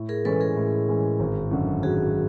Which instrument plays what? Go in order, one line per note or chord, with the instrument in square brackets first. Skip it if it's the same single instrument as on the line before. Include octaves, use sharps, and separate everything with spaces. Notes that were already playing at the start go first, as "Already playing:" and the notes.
Already playing: [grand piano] A2
[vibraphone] G#4 A#4
[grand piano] E3 G#3 C#4 [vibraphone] A4 B4
[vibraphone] G#4 A#4
[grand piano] A2
E3 G#3 C#4
G#1
F#2 D3
[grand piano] G#1 [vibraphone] F#4 G#4